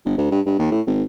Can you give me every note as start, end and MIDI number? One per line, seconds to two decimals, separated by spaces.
0.05 0.15 31
0.18 0.30 38
0.31 0.40 43
0.46 0.58 43
0.59 0.70 39
0.71 0.81 45
0.87 1.03 32